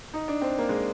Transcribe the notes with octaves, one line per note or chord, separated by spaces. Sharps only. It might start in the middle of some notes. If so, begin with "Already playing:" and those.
D#4
D4
C4
A#3
G#3